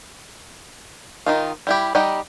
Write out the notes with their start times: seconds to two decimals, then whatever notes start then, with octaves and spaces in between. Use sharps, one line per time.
1.26 D#3 D#4 F4
1.67 G3 E4 G4
1.95 G3 D#4 G4 D#5 F#5